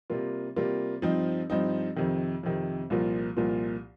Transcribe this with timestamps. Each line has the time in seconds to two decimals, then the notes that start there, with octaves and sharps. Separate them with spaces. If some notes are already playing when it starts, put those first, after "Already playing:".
0.10 C3 G3 A#3 F4
0.56 C3 G3 A#3 F4
1.02 G2 F3 C4 D#4
1.50 G2 F3 C4 D#4
1.96 F2 C3 D#3
2.43 F2 C3 D#3
2.90 C2 A#2 F3 A#3 F4
3.37 C2 A#2 F3 A#3 F4